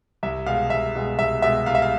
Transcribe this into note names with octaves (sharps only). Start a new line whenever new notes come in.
C2 E5
B2 G#3 F5
C2 E5
B2 G#3
C2 E5
B2 G#3 E5
C2 F5
E5
F5